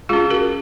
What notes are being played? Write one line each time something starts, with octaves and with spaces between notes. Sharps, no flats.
G#3 C#4 F4 G#4
F#4 A#4